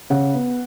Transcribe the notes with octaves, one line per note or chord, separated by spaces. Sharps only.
C#3 F#5
B3